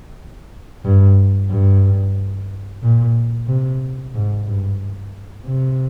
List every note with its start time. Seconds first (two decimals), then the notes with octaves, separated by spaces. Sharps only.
0.85 G2
1.50 G2
2.83 A#2
3.49 C3
4.14 G#2
4.48 G2
5.46 C3